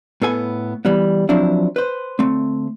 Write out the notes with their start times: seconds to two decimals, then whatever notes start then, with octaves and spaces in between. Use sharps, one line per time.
0.22 A2 B3 A4 G#5
0.85 E3 G3 B3
1.29 F3 F#3 C4 D4 E4
1.76 B4 C5
2.19 D2 A3 C4